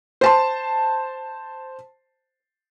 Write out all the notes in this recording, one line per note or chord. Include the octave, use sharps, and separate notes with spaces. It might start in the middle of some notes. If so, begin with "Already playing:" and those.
C5 A5 C6